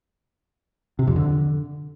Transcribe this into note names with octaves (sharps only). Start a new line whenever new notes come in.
C3
F2
D3